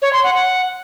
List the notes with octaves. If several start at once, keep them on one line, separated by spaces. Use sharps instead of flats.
C#5
C6
F#5
F#5